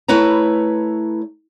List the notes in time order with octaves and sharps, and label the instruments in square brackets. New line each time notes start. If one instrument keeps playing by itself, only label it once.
[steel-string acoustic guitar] A3 E4 B4 C#5 A#5